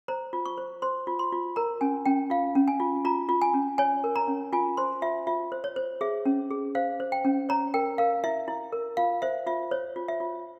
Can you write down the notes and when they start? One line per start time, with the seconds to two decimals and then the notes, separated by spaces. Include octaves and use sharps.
0.08 C5 A#5
0.33 F4
0.45 C#6
0.58 C5
0.82 C5 C6
1.07 F4
1.19 C6
1.32 F4
1.56 A#4 A#5
1.81 C#4 G#5
2.05 C#4 G5
2.30 F4 F5
2.55 C#4
2.68 G#5
2.80 F4
3.05 F4 A#5
3.29 F4
3.42 G#5
3.54 C#4
3.78 C#5 G#5
4.04 A#4
4.16 A#5
4.28 C#4
4.53 F4 G#5
4.77 C5 C6
5.02 F4 E5
5.27 F4 E5
5.52 C5
5.64 C#5
5.76 C5
6.01 G#4 E5
6.26 C#4
6.51 G#4
6.75 C5 F5
7.00 C5
7.12 G5
7.25 C#4
7.49 C#5 A#5
7.74 A#4 G5
7.98 A#4 F5
8.24 E4 E5
8.48 E4
8.72 A#4
8.97 F4 F5
9.22 C5 E5
9.47 F4 E5
9.71 C5 C#5
9.96 F4
10.08 E5
10.20 F4